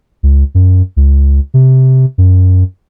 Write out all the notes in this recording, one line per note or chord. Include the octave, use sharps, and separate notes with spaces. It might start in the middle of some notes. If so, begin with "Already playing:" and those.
C#2
F#2
C#2
C3
F#2